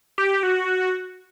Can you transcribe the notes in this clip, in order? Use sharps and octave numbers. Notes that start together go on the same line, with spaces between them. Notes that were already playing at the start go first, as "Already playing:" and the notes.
G4
F#4